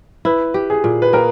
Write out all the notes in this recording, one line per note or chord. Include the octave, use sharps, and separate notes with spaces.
E4 B4
G4
G#4
A#2
B4
A#3 A#4